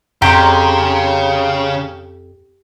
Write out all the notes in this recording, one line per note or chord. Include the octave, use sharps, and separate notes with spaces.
F2 C#3 G4 A#5 C6